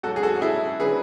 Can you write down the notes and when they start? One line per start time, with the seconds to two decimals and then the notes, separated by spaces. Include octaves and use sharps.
0.03 G#2 F#4 A4
0.07 F#3
0.16 G#4
0.23 F#4 A4
0.41 E4 G#4
0.80 D3 F#3 G#4 B4